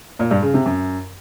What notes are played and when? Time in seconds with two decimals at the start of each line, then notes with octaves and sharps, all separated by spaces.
0.19 A#2
0.31 G2
0.42 C#3
0.54 C3
0.66 F#2